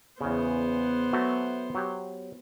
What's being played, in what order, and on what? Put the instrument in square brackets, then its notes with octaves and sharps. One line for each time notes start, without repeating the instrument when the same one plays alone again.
[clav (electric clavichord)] E2 C#3 [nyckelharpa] B3 C5
[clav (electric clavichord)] F#3 A3 F#4
F#3 G4